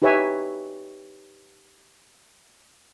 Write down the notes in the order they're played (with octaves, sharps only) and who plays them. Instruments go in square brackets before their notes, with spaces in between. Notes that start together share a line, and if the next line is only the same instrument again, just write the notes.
[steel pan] D#4 G4 B4 C#5 E5 G#5